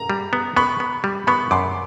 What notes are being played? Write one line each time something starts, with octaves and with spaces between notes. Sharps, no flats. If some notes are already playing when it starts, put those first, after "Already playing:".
Already playing: A#5
G3
B3
B3 B5 C#6
B3
G3
B3 B5 C#6
F#2 C6 D6